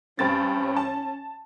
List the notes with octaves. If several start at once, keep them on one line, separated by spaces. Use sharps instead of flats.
G2 C4 C#4 A6
A5